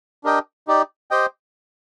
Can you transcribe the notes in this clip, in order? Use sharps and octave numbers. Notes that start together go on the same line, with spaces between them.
D4 G4 A#4 D#5 G5
D#4 G4 D5
G4 C5 D#5 G5